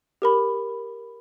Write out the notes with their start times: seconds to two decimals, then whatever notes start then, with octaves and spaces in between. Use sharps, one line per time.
0.22 G4 A#4 B5